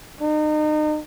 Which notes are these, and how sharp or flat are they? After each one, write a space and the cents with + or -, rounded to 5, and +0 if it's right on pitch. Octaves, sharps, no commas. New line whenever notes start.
D#4 -35